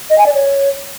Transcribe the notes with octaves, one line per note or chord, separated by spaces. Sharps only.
D#5
G#5
D5
C#5